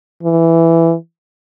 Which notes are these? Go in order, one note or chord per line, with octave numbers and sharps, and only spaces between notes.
E3